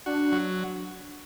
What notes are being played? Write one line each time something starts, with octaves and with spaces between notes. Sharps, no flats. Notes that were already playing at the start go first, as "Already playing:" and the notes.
D4 F#4
F#3